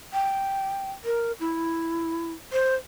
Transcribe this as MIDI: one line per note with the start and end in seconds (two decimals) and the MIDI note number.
0.13 0.91 79
1.05 1.32 70
1.40 2.32 64
2.53 2.75 72